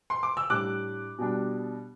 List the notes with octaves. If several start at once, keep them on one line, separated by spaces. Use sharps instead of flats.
C6
D6
E6
A2 G3 D4 D6 F#6
B2 G3 D4